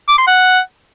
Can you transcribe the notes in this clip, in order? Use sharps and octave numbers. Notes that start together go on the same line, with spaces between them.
D6
C6
F#5